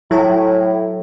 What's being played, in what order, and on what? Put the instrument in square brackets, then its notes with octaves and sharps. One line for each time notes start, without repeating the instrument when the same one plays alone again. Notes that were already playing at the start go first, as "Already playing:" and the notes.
[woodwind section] A2 [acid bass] F#3 [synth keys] E4 G5 G#5